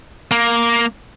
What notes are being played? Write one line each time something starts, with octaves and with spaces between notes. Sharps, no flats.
A#3